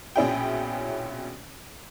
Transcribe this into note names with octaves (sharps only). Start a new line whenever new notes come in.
A#1 B2 C#4 E4 G#4 G5